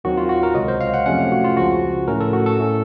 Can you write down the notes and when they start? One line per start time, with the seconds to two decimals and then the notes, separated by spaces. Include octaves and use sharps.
0.04 D#2 D#3 F#3 C4 F#4
0.17 F4
0.29 F#4
0.43 A#4
0.55 C#2 C3 F#3 D#5
0.68 C5
0.81 F5
0.94 F#5
1.06 F2 C3 F3 A3 C#4 F#5
1.18 F5
1.32 F#4
1.44 F4
1.57 C#2 C#3 F3 F#4
2.08 A2 A3 C#4 A#4
2.20 A4
2.33 F#4
2.46 A4
2.58 A2 A3 C#4